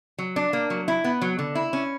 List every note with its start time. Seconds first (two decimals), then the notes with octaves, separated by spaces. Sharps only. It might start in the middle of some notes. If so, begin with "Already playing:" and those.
0.18 F#3
0.36 D4
0.53 A#3
0.70 F#3
0.88 E4
1.04 B3
1.22 F#3
1.39 D3
1.55 E4
1.73 C#4